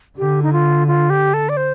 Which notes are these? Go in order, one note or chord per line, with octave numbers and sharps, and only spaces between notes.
D3 G4
D#4
F4
F4
G4
A4
D5
C5